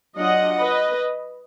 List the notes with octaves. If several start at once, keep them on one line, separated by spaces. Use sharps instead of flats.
F#3 D4 F4 D#5 F#5
B4 D#5